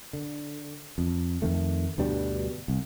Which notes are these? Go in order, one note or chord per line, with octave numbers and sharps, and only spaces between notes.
D3
F2
F2 D#3 A3
D2 G2 B2 G3
C2